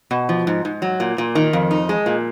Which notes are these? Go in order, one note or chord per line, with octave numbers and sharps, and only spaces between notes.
B2
F3
G#2
G#2
F#3
A#2
A#2
D#3
F2
D#4
G#3
A#2